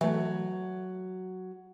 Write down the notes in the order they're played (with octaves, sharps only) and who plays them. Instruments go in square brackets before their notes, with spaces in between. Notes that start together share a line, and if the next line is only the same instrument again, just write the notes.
[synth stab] E3 A3 [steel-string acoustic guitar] F#3